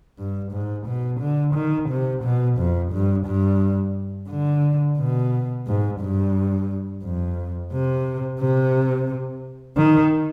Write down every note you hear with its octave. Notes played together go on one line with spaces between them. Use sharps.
G2
G#2
B2
D3
D#3
C3
B2
F2
G2
G2
D3
B2
G#2
G2
F2
C3
C3
D#3